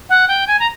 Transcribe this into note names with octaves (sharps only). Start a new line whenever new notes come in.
F#5
G5
G#5
A#5